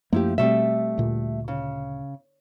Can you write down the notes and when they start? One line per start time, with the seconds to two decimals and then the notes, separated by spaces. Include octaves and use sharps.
0.13 F#2 F3 A3 A#3 E4 G4
0.38 B2 G3 A3 C4 E5
0.98 D2 A#2
1.48 C#3